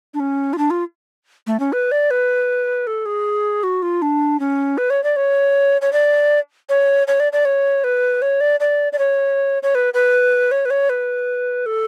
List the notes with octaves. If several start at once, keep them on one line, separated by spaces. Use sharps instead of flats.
D4
C#4
F4
D4
F4
A3
C#4
B4
D5
B4
A4
G#4
F#4
F4
D4
C#4
B4
C#5
D5
C#5
C#5
D5
C#5
C#5
D5
D5
C#5
B4
C#5
D5
D5
D5
C#5
C#5
B4
B4
C#5
B4
C#5
B4
A4